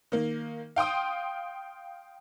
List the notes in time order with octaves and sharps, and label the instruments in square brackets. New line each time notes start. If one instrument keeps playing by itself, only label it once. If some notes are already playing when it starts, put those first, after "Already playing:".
[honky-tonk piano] D#3 A#3
F5 G5 C6 D#6